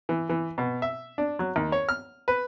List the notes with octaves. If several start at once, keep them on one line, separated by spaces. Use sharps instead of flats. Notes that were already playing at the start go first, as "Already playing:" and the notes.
E3
E3
B2
E5
D4
F#3
D#2
C#5
F6
B4